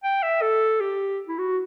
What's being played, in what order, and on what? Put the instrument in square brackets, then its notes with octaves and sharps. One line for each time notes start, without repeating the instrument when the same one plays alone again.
[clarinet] G5
E5
A4
G4
E4
F#4